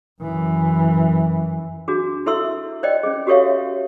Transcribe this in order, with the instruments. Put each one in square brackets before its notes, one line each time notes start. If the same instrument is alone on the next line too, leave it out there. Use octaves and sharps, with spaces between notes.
[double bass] F#2 E3
[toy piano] D4 F#4 G#4
E4 A4 E5 C6 E6
C5 D5 D#5 G5
C#4 G#4
F#4 G4 A4 C#5 E5 F5